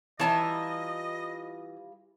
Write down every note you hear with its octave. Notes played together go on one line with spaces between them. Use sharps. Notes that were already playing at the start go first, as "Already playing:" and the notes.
E3 G3 F4 C#5 D#5 E5 A5 A#5